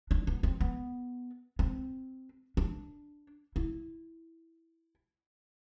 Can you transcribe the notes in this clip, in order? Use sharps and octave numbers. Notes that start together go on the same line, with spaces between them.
D4
B3
C4
B3
C4
D4
E4